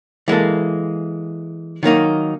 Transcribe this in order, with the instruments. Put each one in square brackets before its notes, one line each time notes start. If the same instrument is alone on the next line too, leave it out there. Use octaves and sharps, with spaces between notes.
[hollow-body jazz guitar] E3 G#3 A#3 A4
D#3 F#3 A#3 D#4